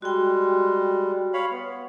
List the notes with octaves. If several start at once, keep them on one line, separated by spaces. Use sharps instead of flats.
G3 G#3 F#4 G5
C#5 F5 B5
B3